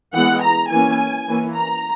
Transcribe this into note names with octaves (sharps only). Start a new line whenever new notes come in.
E3 G#3 B3 F#5
A#5
E3 A#3 C#4 G#5
E3 A#3 C#4
A#5